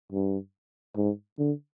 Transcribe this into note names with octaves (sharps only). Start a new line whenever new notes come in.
G2
G#2
D3